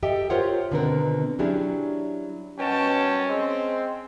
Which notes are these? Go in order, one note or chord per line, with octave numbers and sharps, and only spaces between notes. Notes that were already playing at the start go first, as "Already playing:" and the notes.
G4 A4 D#5 E5 G5
F4 G4 A#4 C5 C#5 F#5
B2 D3 D#3 B3 C4 A#4
F#3 C#4 D4 E4 G4 G#4
B2 C#4 F#4 G5 A5
G#3 C4